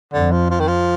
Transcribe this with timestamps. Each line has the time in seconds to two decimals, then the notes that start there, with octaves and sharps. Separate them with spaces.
0.14 F2 D3
0.32 F3
0.50 F3
0.60 D#3
0.68 F3